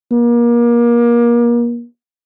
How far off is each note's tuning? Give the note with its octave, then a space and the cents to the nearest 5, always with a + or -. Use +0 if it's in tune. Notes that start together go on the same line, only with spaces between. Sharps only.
A#3 +30